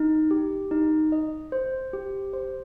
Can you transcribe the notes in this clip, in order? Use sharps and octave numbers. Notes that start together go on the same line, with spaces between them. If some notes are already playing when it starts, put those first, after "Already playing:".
Already playing: D#4
G4
D#4
D#5
C5
G4
C5